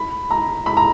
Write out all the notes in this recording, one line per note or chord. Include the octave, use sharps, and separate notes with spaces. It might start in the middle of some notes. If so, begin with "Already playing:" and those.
Already playing: B5
A#5
B5
A#5